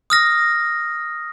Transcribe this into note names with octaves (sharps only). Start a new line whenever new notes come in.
D#6 F6 A#6